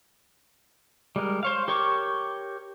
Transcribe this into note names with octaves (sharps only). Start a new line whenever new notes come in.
G3 G#3 A#4
C5 C#5 F5
G4 A#4 C#5 C#6 D6